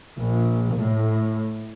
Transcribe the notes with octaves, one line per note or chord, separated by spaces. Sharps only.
A#1
A2